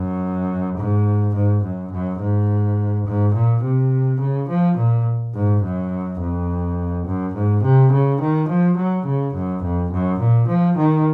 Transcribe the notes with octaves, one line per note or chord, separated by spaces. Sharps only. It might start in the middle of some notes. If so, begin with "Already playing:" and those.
Already playing: F#2
G#2
G#2
F#2
F#2
G#2
G#2
A#2
C3
C#3
F3
A#2
G#2
F#2
F2
F#2
G#2
C3
C#3
D#3
F3
F#3
C#3
F#2
F2
F#2
A#2
F3
D#3